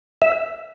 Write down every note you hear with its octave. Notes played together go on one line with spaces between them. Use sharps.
E5